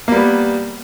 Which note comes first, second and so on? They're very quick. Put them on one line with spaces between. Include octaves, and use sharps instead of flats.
A#3 G3 B3